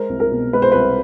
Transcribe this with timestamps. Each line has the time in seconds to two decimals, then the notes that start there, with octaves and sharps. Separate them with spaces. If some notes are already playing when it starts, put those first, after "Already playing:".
Already playing: G#3 A#4 C5
0.09 C2
0.20 A#4
0.31 B2
0.53 G#3 B4
0.62 C5
0.72 C2 B4